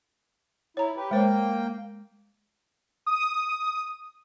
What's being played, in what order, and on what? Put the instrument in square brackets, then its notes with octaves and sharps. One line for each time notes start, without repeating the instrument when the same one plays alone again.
[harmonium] E4 [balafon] C#5 A#5
[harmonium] G4 B4
[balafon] G#3 C5 C#5 [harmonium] A#3 G5
[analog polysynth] D#6